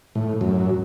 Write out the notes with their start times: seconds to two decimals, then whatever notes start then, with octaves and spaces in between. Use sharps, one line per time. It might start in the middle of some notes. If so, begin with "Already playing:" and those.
0.15 A2
0.41 F#2